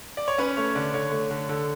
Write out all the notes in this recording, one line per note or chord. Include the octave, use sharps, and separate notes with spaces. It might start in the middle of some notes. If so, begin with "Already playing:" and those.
D5
C#5
C#4 B4
A3 C#5
D3 D5
D3 C#5
A3
D3
D3 A4